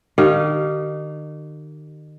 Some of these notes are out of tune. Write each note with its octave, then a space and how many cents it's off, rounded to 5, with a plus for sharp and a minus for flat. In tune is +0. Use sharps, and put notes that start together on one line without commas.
D#3 -35 G4 -35 F5 +5